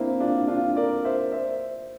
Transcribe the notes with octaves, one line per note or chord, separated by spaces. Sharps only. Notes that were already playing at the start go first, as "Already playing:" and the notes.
Already playing: A#3 C4 D4 E4
D4 F4
D4 F4
A#4 D5
C5 E5
C5 E5